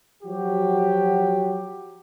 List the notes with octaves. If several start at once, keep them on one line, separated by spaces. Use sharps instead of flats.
F3 F#3 F#4 G4